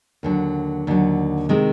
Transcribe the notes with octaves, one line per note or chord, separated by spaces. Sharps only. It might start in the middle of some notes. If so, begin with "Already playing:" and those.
D#2 D3 F#3
D#2 D3 F#3
C3 D#3 G#3 C4